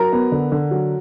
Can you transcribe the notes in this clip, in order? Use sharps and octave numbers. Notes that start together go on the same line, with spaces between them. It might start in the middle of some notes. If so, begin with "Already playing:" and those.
Already playing: F#3 A#4 A#5
B3
D3
D3
F#3